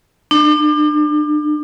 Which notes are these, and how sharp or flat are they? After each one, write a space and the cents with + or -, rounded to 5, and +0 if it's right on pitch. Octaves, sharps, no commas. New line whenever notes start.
D4 +35